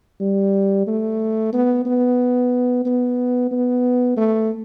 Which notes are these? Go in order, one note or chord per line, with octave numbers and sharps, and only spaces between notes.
G3
A3
B3
B3
B3
B3
A3